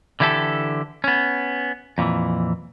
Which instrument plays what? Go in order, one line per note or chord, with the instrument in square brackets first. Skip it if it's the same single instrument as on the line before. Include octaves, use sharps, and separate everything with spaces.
[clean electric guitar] D3 E3 E4 G4 A4
B3 C#4
F2 A#2 D#3 E3